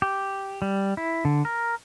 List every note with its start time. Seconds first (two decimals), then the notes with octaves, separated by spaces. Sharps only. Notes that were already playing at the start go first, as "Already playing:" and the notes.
0.02 G4
0.62 G3
0.97 E4
1.25 D3
1.45 A#4